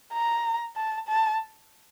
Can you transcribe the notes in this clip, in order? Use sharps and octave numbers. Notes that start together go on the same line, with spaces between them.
A#5
A5
A5